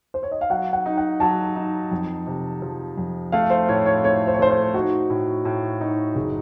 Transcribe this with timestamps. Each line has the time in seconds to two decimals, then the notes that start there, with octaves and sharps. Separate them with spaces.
0.14 C5
0.23 C#5
0.32 D#5
0.41 F5
0.50 F#3 F#5
0.73 F#5
0.86 D#4
0.97 F#5
1.20 F#3 A5
1.56 D#4
1.91 F2
2.27 C3
2.62 F3
2.98 F2
3.32 A3 F5
3.50 C5
3.69 A2 C#5
3.86 C#5
4.04 A3 C#5
4.27 C5
4.34 C#5
4.39 A3 C5
4.50 C5
4.74 D#4 F#4
5.10 A2
5.45 A2
5.81 D#4
6.15 F#1